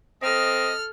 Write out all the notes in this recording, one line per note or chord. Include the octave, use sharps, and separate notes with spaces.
C4 A4 D#5 F6